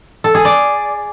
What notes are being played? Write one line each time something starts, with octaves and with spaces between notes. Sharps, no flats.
A4
G#4
D5